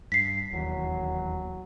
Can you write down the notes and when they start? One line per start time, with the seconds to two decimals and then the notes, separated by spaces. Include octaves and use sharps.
0.12 G2 B6 C7
0.52 E1 D#2 E3 F#3